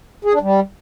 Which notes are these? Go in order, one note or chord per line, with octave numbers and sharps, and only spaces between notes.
G#4
D4
G3